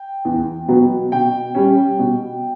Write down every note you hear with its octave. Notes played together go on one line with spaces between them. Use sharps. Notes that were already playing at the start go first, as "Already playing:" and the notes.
Already playing: G5
E2
B2 F#3 B3
B2 G5
G3 C#4
B2